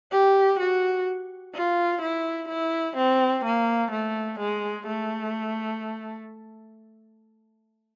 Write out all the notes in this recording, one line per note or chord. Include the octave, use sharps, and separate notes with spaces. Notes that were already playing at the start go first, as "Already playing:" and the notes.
G4
F#4
F4
E4
E4
C4
A#3
A3
G#3
A3